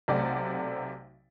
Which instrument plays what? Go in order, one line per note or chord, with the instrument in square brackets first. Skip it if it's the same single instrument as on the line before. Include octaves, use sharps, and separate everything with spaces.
[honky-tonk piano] B1 C3 A3 C4 D5 F#5